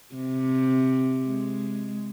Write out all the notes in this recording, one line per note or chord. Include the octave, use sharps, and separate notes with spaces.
C3
G#3